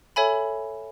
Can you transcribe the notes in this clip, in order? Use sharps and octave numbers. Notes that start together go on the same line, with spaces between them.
A4 C#5 E5 G#5 B5